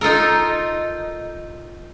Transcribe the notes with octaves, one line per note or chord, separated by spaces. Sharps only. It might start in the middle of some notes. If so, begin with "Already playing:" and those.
D#4 F4 A4 A#4